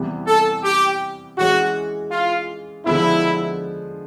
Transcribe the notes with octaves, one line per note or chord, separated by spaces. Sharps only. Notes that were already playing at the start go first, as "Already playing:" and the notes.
Already playing: C3 E3 G3 B3
A4
G4
E3 G#3 C#4 F#4
F4
D3 F3 G#3 B3 E4